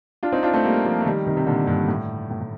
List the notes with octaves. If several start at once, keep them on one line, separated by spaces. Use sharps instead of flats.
D4 F4
C4 D#4
D4 F4
A3 C4
G3 A#3
F3 A3
A3
D#3 G3
C3 D#3
C3
A#2 D3
G2 A#2
A2
A2
A2